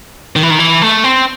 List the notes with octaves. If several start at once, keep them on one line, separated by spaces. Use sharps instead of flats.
D#3
E3
D#3
E3
A3
C4